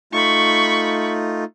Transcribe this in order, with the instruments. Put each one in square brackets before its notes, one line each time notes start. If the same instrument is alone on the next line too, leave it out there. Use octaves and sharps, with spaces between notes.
[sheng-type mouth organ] A3 D#4 F4 [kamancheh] B5 C#6